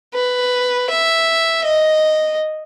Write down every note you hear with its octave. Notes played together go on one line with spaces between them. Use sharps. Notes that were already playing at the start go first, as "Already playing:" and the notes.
B4
E5
D#5